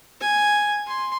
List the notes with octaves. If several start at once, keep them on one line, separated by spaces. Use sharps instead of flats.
G#5
C6